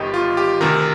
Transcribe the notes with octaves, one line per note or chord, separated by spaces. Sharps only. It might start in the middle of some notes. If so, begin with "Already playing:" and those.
Already playing: G1 G2 D#3 G4 D#5 G5
F4
G4
D2 C3 D#3 A#4